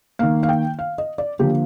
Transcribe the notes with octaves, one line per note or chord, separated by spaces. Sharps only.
D#3 A#3 F5
F5
G5
F5
D#5
D5
D3 F3 A#3 G4